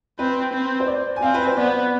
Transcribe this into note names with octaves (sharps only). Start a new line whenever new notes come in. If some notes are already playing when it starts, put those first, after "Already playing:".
C4 B4
C4
C5
D5
G#5
C4 F5
B4
C5
B3 D5